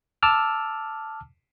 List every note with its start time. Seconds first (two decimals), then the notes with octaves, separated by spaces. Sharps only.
0.23 A5 D6 E6 F6